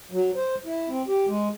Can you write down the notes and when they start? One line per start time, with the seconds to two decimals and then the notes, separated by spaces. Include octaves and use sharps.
0.11 F#3
0.36 C5
0.65 E4
0.88 C4
1.08 G4
1.27 G#3